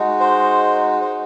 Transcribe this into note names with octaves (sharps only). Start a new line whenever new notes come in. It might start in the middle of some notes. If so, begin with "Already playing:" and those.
Already playing: G#3 D#4 F#4
C5
C5